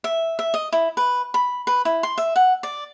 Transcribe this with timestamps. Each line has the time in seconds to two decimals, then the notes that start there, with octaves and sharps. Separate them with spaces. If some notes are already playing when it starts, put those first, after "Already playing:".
0.04 E5
0.39 E5
0.54 D#5
0.72 E4
0.97 B4
1.34 B5
1.67 B4
1.85 E4
2.03 C6
2.18 E5
2.36 F#5
2.63 D5